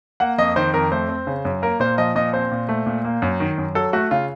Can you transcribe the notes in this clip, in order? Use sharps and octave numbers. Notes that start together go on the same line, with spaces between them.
A#3 F#5
F2 D#5
D#3 C5
F2 A#4
A3 C5
C4
C#3
F#2
A#3 A#4
A#2 C5
F3 D#5
A#2 D#5
C4 C5
A#2
A3
A#2
A#3
F#2
D#3
F#2
F#3 A4
A3 F#4
C#3 F4